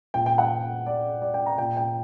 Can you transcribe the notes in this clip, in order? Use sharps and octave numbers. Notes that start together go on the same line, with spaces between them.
A#2 G5
G5
F#5
D5
D5
G5
A#5
A#2 G5
G5